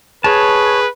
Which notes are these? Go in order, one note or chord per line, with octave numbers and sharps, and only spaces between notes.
G#4 B4 C#5 A5